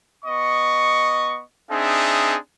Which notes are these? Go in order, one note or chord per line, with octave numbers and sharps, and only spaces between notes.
B3 D#5 C#6
C4 D4 D#4 G#4 E5